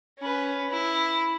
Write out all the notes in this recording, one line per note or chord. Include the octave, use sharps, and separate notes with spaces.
C#4 B4
E4